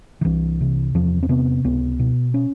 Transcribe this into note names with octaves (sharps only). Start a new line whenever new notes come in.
D#3
C2 E3
C3
E2 F3
C4
C3 B3
C#2 B3
B2
C#4